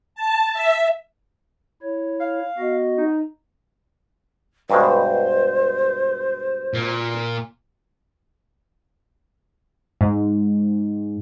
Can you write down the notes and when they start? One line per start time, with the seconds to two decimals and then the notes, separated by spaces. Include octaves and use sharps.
0.15 A5
0.53 E5
1.82 E4 C#5
2.20 F5
2.58 B3 F#4 D#5
2.98 D#4
4.70 G2 B2 G#3 C5
6.74 A#2
10.01 G#2